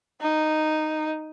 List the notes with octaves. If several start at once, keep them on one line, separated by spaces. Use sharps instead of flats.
D#4